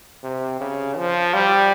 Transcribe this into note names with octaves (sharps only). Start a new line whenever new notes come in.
C3
C#3
F3
G3